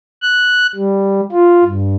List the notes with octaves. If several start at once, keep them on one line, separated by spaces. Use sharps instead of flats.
F#6
G3
F4
G2